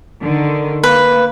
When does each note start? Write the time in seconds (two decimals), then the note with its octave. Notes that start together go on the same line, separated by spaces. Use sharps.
0.22 D3 D#3
0.84 A#3 B4